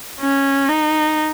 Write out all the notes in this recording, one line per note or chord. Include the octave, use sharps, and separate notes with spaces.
C#4
D#4